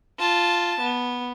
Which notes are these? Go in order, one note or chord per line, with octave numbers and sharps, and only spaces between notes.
F4 A5
B3